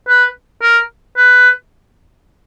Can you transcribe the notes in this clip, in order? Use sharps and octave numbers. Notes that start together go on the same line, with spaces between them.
B4
A#4
B4